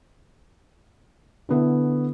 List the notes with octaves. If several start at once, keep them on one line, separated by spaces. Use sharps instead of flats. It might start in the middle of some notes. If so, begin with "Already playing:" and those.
D3 B3 E4